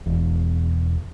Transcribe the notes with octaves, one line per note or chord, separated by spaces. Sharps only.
E1